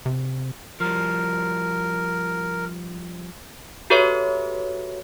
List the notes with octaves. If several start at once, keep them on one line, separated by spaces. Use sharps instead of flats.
C3
F3 G3 A#4
F#4 G4 A4 B4 C#5 E5